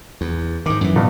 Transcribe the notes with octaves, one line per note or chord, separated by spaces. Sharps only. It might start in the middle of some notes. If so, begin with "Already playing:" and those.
E2
G#2 D#3 D6
F#2 E3
G2 B2